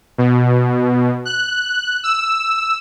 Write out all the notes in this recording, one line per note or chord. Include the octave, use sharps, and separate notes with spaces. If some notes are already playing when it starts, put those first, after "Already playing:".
B2
F#6
E6